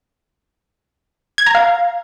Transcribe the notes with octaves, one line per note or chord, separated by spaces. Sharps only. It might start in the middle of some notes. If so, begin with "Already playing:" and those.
G#6
A#5
F5